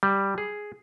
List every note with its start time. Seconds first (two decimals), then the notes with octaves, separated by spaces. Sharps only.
0.03 G3
0.38 G#4